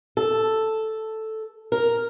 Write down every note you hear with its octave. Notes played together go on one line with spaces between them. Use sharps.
A4
A#4